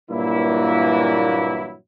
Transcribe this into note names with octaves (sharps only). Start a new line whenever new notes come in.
G2 A#2 E3 F#3 A#3 E4